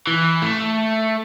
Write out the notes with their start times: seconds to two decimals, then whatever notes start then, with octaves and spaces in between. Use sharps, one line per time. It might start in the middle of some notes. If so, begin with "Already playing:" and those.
0.07 E3
0.42 A3